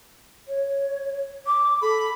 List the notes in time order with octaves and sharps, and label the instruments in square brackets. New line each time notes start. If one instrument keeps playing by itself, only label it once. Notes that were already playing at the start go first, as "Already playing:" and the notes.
[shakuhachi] C#5
D6
[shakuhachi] A4 [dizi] B5